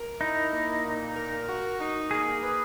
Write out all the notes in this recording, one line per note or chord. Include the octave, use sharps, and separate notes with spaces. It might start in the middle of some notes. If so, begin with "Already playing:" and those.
Already playing: A#4
D#4 E4
A#3
A#2
A#4
F#4
D#4
A#3 G#4
B4